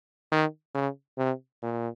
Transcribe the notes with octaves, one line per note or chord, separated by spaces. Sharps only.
D#3
C#3
C3
A#2